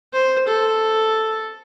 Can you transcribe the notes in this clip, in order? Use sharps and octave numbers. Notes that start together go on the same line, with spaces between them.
C5
A4